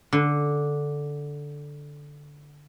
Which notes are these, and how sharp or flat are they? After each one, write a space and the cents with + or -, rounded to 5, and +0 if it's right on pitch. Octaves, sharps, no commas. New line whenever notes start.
D3 -5